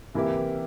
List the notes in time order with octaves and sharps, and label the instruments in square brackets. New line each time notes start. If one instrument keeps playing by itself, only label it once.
[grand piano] C3 E3 A#3 E4 G4